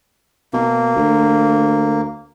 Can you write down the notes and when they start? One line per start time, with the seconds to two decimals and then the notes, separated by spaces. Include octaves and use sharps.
0.53 B2 A#3
0.96 D2